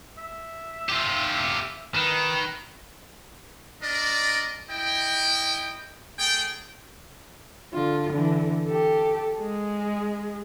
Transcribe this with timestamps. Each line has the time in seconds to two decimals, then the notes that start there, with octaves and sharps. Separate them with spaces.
0.18 E5
0.89 F4 G4
1.95 D#3 B4
3.82 D4 A#4 D5 D#5
4.70 E4 D#5 G5
6.18 A3 G#4 G5
7.73 D3 F4
8.11 D3 E3
8.68 G4 A4
9.40 G#3 G#4